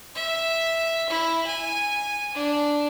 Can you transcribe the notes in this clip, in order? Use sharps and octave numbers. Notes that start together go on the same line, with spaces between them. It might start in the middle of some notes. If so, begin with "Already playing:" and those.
E5
E4
G#5
D4